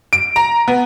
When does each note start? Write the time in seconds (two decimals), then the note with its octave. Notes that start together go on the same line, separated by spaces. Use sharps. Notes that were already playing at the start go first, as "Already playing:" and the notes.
0.13 D7
0.36 A#5
0.68 B3